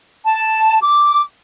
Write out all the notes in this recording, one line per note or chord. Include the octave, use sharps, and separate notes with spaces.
A5
D6